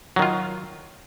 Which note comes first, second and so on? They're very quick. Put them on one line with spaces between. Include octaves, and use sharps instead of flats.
F#3 D#3 F4